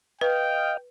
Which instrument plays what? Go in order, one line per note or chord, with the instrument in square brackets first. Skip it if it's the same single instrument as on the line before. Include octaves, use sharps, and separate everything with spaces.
[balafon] B4 [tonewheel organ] D#5 F5 [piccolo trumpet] G5